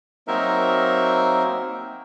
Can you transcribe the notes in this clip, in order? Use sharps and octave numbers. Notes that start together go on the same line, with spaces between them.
F#3 A#3 C4 D#4 A#4 E5